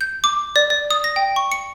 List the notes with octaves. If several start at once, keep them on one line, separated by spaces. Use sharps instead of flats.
G6
D6
D5
D5
D#6
A#6
G5
C#6
C#7